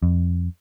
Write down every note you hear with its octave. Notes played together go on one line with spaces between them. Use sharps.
F2